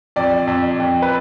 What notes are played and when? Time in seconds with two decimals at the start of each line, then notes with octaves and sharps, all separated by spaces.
0.16 F2 D5
0.47 F2
0.79 F2
1.02 B4